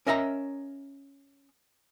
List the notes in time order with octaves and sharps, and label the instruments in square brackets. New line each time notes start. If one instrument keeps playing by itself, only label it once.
[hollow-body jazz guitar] C#4 A#4 D#5 E5 G#5 A#5